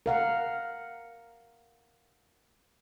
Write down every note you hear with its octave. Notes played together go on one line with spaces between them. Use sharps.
A#4 F5 F#5